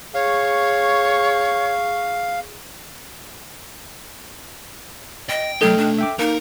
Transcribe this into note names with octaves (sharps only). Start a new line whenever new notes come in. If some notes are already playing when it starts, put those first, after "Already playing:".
G#4 C#5 F5 C#6
D#5 G5
F#3 A3 D#4 A4 D#5 G5 F6 G7
D4
E5 G5 D6
A#3 D#4 A#4